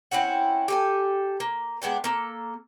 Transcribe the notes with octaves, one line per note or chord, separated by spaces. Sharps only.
C4 C#4 E4 F#5
G4 A4 G#5
A#3
G#3 B3 D4 G5
A#3 A4